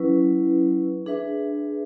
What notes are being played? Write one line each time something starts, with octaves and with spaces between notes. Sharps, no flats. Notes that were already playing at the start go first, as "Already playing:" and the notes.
Already playing: F#3 C#4 E4 B4
D4 G#4 B4 E5